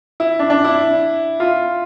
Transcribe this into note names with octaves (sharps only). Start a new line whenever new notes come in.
E4
D4
D4
E4
F4